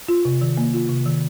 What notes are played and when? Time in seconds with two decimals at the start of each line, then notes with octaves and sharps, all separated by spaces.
0.08 F4
0.25 C3
0.42 D#3
0.58 A#3
0.74 F4
0.89 C3
1.06 D#3